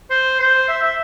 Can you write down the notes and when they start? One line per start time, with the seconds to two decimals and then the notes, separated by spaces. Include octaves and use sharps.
0.10 C5
0.39 C5
0.68 E5
0.82 E5